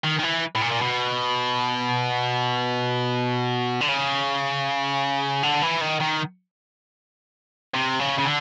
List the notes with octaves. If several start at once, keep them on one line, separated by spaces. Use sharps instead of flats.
D#3
D#3
E3
A2
A#2
A#2
B2
D3
C#3
D3
E3
D#3
D#3
C3
C#3
C#3
D3